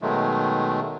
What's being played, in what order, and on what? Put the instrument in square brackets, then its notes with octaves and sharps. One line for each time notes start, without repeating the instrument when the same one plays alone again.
[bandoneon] B2 D#3 F#3 G#3 A3